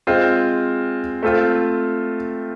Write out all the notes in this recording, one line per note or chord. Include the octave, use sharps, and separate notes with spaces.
G#3 C4 F4
A3 C4 F4